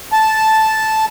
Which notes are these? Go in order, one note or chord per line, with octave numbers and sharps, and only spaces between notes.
A5